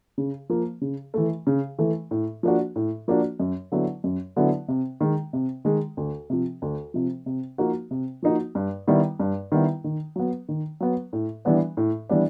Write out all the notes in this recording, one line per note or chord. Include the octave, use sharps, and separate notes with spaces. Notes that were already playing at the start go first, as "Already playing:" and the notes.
C#3
F3 A#3
C#3
E3 A3
C#3
E3 A3
A2
F3 A#3 D4 F#4
A2
F3 A#3 D4 F#4
F#2
D3 F#3 B3 E4
F#2
D3 F#3 B3 E4
C3
D#3 G#3
C3
D#3 G#3
D2
C3 F3
D2
C3 F3
C3
F3 A#3 D#4 F#4
C3
F3 A#3 D#4 F#4
G2
D#3 G3 B3 E4
G2
D#3 G3 B3 E4
D#3
F#3 B3
D#3
F#3 B3
A2
E3 G3 B3 D4
A2
E3 G3 B3 D4